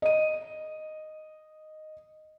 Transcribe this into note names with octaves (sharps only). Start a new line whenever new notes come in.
D#5 D#7